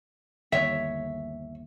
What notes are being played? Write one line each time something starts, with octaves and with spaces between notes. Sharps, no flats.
G1 D#2 C#5 E5